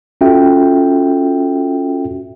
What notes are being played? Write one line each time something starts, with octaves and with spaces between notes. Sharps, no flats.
C#4 F4 F#4 A4 E5 G5